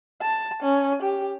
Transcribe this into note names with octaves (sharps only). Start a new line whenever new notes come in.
A5
C#4
G4